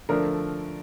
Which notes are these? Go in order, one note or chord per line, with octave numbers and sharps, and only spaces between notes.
D3 F3 A3 D4 A#4